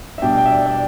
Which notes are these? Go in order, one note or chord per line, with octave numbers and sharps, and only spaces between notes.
E5
B2 G3 D4 G5
G5
E5
D5
D5